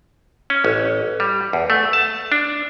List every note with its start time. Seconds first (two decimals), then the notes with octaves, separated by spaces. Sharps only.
0.50 C#4
0.65 A1
1.20 G3
1.53 E2
1.70 A3
1.93 A5
2.32 D4